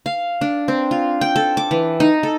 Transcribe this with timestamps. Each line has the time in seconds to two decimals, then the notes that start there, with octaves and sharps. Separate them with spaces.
0.06 F5
0.41 D4
0.68 C4
0.91 F4
1.21 G5
1.36 A4
1.57 D6
1.71 E3
2.00 D#4
2.23 A4